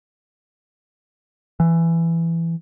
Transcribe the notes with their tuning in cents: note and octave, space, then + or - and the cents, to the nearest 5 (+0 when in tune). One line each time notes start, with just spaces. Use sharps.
E3 +15